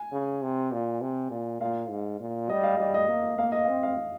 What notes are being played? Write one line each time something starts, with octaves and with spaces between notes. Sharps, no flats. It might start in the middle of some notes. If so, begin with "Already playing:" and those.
Already playing: G#5
C#3
C3
A#2
C3
A#2
A#2 F5
G#2
A#2
G3 D#5
F5
G3 D#5
D#5
A#3
A#3 F5
D#5
F5
C4
F5